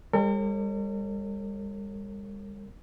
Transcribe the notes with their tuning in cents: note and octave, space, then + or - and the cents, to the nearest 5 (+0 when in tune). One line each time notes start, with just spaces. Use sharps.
G3 +40 A#4 -45 C#5 -35